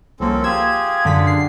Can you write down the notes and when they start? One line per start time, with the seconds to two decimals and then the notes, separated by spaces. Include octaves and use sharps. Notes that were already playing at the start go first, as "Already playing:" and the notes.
0.20 C2 F3 A#3 C4 C#4 A4
0.44 F4 G4 G#4 E6 G#6
1.05 F#2 D3 B6
1.27 C7